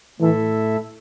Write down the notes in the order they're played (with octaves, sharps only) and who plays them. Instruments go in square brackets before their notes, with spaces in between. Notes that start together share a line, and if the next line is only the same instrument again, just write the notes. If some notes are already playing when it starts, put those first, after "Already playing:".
[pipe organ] A2 A3 E4 A4 E5 [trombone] E3